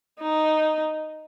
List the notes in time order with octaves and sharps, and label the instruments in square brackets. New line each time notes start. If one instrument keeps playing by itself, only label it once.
[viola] D#4